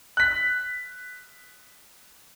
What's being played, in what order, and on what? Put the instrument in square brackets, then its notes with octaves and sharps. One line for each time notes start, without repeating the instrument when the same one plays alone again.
[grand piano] F#6 B6